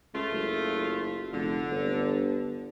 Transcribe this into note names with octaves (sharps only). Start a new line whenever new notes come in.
C#2 A3 F4
F#1
F1 D3
G1